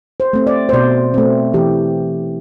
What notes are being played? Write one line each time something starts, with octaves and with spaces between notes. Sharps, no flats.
C5
A3 C4
D5
C5
B2 D5
A3 C4
E3 G4